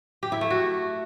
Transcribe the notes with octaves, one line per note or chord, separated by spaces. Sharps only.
G4
E4
A3
F#4